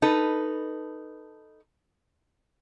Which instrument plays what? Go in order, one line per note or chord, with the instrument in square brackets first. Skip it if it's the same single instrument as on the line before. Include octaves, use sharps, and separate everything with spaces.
[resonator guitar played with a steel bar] D#4 A4 B4